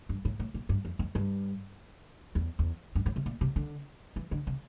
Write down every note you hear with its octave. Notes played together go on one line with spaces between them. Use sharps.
G2
A2
A2
A#2
G2
F2
F2
G2
E2
E2
G2
A2
C3
A#2
C3
D3
E3
D3
C3